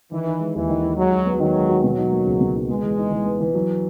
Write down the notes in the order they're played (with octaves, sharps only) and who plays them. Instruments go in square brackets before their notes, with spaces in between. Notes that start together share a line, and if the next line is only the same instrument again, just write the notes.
[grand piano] D#3 [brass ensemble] E3
[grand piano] D#4
G#3
[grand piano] D#2 [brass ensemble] E3
[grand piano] D#3
D#4
[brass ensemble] F#3 [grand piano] G#3
[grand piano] F#4
B3
[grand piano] D#3 [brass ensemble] F#3
[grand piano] G#3
F#4
[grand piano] B2 [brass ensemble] F#3
[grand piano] D#4
A#3
C#2
B2
D#4
[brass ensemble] G#3 [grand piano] B3
[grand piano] E3
D#4
E3
B3
E3
F#3